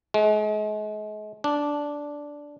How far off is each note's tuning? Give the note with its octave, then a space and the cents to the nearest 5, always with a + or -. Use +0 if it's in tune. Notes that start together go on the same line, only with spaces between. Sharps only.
G#3 +40
D4 -10